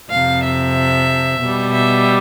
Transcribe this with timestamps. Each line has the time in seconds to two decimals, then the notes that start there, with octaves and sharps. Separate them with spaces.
0.10 F2 C3 F3 F5
0.43 E5
1.41 B2 G3
1.72 E5